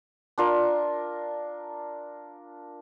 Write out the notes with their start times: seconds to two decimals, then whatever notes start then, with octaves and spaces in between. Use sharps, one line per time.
0.38 D4 F4 A#4